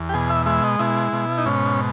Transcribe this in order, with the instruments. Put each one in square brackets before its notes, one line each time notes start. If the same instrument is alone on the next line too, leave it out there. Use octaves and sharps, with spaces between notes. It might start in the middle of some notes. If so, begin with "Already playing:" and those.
Already playing: [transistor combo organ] E2
G4
B2 G#4
E5
G#3 E5
D#5
B2 E4
B2
D#4
G#2 C#4